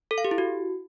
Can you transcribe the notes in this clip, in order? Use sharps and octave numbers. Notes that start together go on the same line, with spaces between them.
A4
F5
G4
E4
F#4